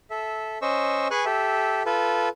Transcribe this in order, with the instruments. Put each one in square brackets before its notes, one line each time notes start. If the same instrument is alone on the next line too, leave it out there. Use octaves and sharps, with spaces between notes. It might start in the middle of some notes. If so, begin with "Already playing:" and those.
[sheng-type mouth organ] A4 E5
C#4 C5 D#5 C#6 E6
G#4 B4 G#5 C#6 F#6
G4 A4 E5
F4 A4 B4